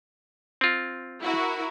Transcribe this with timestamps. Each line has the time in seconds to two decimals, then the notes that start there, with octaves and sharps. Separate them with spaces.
0.61 C4 F4
1.21 E4 F#4 A#4